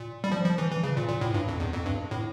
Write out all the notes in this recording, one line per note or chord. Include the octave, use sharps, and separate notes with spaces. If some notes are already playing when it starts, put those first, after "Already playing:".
Already playing: A#2
G3
F3
F3
E3
E3
C#3
A#2
A#2
A2
G2
F2
E2
F2
G2
A2